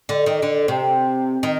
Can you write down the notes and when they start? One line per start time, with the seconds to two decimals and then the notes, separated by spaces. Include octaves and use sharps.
0.09 D3
0.26 D#3
0.42 D3
0.68 C3
1.43 D#3